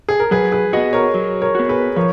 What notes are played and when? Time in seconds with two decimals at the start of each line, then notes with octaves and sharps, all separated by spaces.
0.09 G#4
0.20 A#4
0.31 F#3 G#4 B4
0.52 G#4 B4
0.72 B3 F#4 B4 D#5
0.93 A#4 C#5
1.14 F#3
1.41 A#4 C#5
1.55 B3 F#4
1.69 G#4 B4
1.96 F3 A#4 C#5